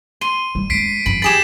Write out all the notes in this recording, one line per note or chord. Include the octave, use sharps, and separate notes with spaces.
C6 D#7
G3
G#3 D4 B6 C7 D7
F#2 E3 B5
G4 G#4 B5 A6 B6 E7